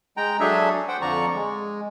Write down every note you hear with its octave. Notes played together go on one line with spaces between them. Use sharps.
G#3 G5 A#5
F#3 D4 G#4 A4 E5
C5 F#5 G5
F2 D3 F3 D5 A#5 C#6
G#3